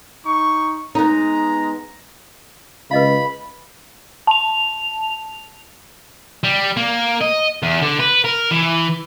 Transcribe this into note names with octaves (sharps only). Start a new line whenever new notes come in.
D#4 C#6
G#3 B3 D#4 A#5
C#2 B4 D#5 F5 B5
A5 F7
G3
A#3
D#5
E2
D3
B4
A#4
E3